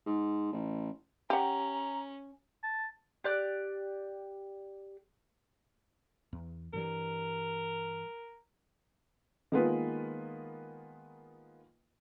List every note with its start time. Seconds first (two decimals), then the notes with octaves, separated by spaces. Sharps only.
0.06 G#2
0.52 A1
1.30 C#4 G4 F#5 A#5
2.64 A5
3.24 G4 D5 F#6
6.33 E2
6.73 G2 E3 G3 A#4
9.52 D#3 G#3 A#3 B3 F4 B4